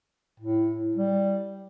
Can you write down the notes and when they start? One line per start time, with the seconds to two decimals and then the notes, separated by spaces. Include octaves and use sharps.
0.40 A2
0.96 G3